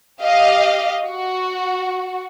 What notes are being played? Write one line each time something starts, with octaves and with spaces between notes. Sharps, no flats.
G4 D#5 F5
F#4